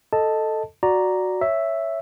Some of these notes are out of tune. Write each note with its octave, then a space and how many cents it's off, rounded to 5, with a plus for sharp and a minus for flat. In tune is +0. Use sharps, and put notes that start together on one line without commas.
A4 +0 D#5 +0 A5 +0
F#4 -5 D5 +0 A#5 +0
C#5 +0 E5 +0